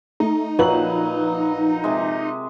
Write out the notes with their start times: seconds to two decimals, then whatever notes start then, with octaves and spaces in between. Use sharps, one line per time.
0.20 A3 D#4
0.59 A#1 A#2 F#3 B4 F#7
1.84 C3 G#3